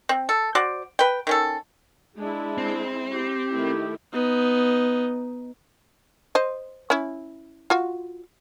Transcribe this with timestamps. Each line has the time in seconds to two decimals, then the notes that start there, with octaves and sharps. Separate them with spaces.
0.09 C4
0.29 A4
0.55 F#4 C5 D5
0.99 B4 G5
1.27 D#3 C#4 A4
2.18 G#3 D4 E4
2.58 C4
3.12 G4
3.52 D#3 A3 E4
4.13 B3 D#4
6.35 C5 D#5
6.90 C#4 E4
7.70 F4 F#4